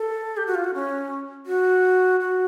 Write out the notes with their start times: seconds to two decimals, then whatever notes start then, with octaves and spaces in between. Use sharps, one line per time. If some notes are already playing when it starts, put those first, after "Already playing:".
Already playing: A4
0.37 G4
0.47 F#4
0.55 F4
0.64 F#4
0.74 C#4
1.46 F#4
2.20 F#4